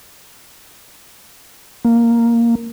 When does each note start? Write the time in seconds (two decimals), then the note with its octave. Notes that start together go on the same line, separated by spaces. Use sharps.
1.85 A#3